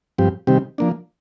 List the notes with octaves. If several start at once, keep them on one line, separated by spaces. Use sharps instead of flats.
G2 F3 C4 G4
C3 D#3 G3 C4 G4
F3 A#3 D4